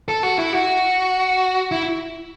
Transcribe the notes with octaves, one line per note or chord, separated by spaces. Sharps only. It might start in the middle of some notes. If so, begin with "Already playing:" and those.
A4
F#4
E4
F#4
E4